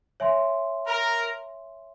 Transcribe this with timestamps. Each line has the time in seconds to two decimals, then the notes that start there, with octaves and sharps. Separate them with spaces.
0.20 C#5 E5 G#5 C6
0.87 A#4